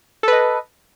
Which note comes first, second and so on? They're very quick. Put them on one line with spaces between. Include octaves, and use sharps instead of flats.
A4 B4 D#5